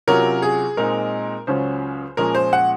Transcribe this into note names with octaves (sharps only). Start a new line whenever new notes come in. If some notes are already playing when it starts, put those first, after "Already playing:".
C3 F#3 C#4 F4 A#4
G#4
A#2 G#3 C4 D#4 A#4
C#2 C#3 F#3 C#4 F4 C5
A#2 F3 G#3 C#4 A#4
C5
F#5